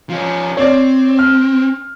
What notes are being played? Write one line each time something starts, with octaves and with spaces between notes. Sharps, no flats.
F3 C#4
C4 C#5 D5
F6